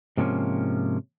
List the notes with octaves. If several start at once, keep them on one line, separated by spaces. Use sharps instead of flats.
G#2 C3 F3 A#3 C#4